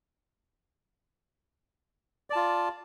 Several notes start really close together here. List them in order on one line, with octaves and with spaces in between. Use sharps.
D5 A5 F4